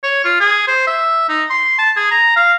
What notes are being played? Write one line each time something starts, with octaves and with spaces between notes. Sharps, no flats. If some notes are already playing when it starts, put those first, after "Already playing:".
C#5
F4
G#4
C5
E5
D#4
C6
A5
G#4
A#5
F5